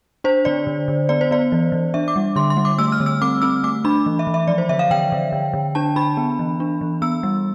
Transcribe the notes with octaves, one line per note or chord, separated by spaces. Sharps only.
D4 C5
D3 D5
D3
D3
B3 D5
C5
B3 D5
E3
E3
D4 E5
D6
G3
D3 C6
C6
G3
D6
A3 E6
F6
D3
E6
C4 D6
C4 E6
A3 D6
D4 B5
E3
E5
E3
E5
F3 D5
C5
D3 E5
F5
D3 G5
D3
D3
D3
D4 A5
D4 B5
B3
E3
D4
E3
B3 E6
G3